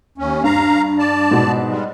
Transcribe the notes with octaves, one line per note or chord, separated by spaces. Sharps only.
D#2 C#4
G2 F5 A#5
D5 A5
G#2 B2
G3 G#3